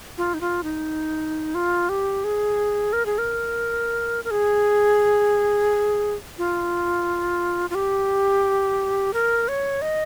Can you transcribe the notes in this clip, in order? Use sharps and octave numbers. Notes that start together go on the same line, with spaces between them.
F4
D#4
F4
D#4
F4
G4
G#4
A#4
G#4
A#4
A#4
G#4
F4
F4
G4
A#4
C#5
D#5